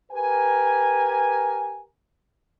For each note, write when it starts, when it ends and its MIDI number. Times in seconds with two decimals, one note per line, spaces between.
0.12 1.84 67
0.12 1.84 70
0.12 1.84 71
0.12 1.84 80